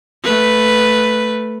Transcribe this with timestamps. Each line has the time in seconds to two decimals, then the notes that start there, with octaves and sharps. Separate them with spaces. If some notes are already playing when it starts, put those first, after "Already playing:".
0.24 A3 B4